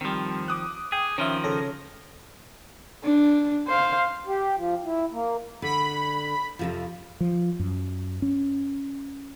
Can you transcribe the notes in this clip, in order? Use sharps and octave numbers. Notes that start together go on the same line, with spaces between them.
D#3 F3 G3 C4
D6 D#6 F#6
G#4 G5
D#3 F3 C#4 E5
C#3 A4 C#5 A#6
D4
C5 F5
G4
F3
E4
A#3
D3 B5
F2 C3 F3
F3
F#2
C#4